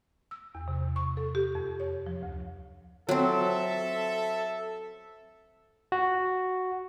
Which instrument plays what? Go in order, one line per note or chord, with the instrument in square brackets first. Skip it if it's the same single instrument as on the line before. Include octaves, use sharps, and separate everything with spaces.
[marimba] E6
E2
C3
C#6
A4
G4
F2
C#5
F3
D2
[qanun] F#3 C4 [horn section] A4 E5
[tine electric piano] F#4